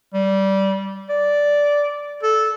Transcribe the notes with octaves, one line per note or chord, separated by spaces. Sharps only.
G3
D5
A4